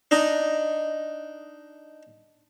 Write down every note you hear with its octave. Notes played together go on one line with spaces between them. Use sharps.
D4 D#4 D#5